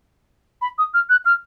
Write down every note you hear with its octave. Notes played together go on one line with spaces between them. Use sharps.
B5
D#6
F6
F#6
F6